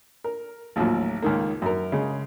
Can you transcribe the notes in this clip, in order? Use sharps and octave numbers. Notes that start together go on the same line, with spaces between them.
A#4
A1 D#2 F3 F#3
C#2 D#3 A#3
F#2 A#4
C#3 G#3